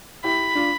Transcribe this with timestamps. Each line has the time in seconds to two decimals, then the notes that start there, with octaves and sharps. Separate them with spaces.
0.24 E4 G4 B5
0.55 D4 F4